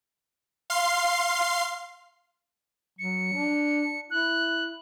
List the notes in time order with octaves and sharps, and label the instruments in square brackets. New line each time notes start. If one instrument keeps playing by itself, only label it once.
[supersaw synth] F5 C6 C7
[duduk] F#3 [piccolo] C#7
[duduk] D4
[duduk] E4 [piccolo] F#6